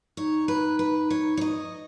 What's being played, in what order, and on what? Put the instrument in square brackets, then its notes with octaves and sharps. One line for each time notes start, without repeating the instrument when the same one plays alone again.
[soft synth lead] D#4 [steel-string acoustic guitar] C#5
[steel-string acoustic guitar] B4
B4
C#5
C#5
D#5